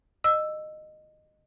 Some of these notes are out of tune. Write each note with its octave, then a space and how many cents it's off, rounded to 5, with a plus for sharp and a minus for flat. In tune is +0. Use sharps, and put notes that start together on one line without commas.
D#5 -15 E6 +5